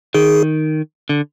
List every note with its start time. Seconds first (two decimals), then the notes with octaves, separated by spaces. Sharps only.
0.14 D#3 G#4
1.09 D3